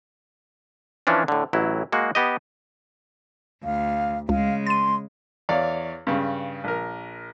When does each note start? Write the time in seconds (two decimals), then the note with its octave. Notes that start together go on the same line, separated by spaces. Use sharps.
1.07 E3 F3 C#4 D4
1.28 A2 D3
1.53 A1 F#3 E4
1.92 G#3 A#3 F#4
2.15 B3 G4 D#5
3.64 D2 F5
4.29 C#2 C#3 G#3 F5
4.67 C6 A6 D#7
5.49 E2 C#5 D5 F5
6.07 G2 C#3
6.64 A#1 A#4